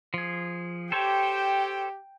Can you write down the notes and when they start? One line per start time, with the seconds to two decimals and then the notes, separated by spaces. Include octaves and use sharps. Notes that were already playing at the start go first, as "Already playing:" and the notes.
0.14 F3 G#4
0.92 G4 A4 C5 C#5 G5